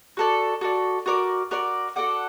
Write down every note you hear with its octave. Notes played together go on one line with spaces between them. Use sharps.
F#4 A4 D5
F#4 A4 D5
F#4 A#4 D5
F#4 A#4 D5
F#4 A4 D5 F#5